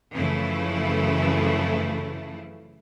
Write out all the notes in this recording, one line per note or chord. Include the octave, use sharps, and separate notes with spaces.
F#2 C#3 E3 F3 A3 E4